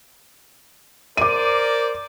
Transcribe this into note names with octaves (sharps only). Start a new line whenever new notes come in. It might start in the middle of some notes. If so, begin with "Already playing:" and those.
A#4 C5 D5 D6 D#7